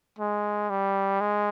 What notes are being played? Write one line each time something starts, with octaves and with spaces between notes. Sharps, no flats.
G#3
G3
G#3